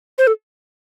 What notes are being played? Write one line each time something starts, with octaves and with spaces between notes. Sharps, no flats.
C5
A4